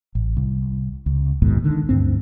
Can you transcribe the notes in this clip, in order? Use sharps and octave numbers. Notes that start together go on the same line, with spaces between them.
A1
C2
C#2
A#1 D#2 G#2 B2
D3 D#3
D2 G2 C4